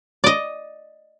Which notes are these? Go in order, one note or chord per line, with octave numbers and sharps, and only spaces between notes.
D5 D#5